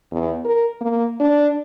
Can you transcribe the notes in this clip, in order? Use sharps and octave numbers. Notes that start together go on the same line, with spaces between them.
E2
A#4
A#3
D4